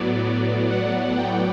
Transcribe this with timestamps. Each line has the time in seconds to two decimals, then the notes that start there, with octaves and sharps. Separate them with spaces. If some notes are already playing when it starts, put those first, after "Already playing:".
Already playing: A2 F#3 B3 D5
0.71 F#5
1.18 G5